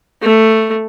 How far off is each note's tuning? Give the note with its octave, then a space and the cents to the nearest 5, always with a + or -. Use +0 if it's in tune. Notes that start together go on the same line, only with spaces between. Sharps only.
A3 +5